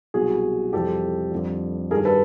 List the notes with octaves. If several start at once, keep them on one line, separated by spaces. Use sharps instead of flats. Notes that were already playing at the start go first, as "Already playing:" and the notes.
C2 B2 F#3 F#4 G#4
F2 C3 E3 G3 G4 A4
F2 D3 G3
G2 D#3 G3 G#4 A#4
A4 B4